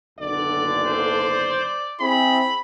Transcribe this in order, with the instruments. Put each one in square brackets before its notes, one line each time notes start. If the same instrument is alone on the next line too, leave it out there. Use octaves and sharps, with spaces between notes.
[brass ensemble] F#1 B1 D3 [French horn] D5
[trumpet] C5
[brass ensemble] C4 E4 G#4 [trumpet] B5